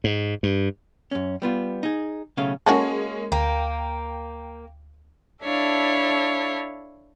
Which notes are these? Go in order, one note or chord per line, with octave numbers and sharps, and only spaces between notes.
G#2
G2
F#2 C#4
G3 B3 F4
D#4 G#4
B1 C#3 A3 C#4 F5
G#3 A#3 C#4 F#4 G#4 A4
D2 A#3 G5
D4 E4 A4 C#5 F5